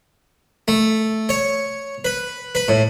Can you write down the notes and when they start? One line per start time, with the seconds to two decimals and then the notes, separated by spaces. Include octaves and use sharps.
0.68 A3
1.29 C#5
2.05 B4
2.55 B4
2.68 A2